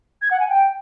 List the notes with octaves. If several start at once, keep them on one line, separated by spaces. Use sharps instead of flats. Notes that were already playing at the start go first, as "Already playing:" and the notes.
G#6
F#5
G#5
G5